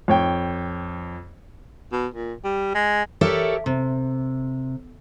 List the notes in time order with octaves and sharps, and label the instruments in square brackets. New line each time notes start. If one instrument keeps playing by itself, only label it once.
[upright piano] F2 C#5 G5
[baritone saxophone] B2
A#2
G3
G#3
[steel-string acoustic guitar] G4 A4 A#4 C#5 D5 E5
C3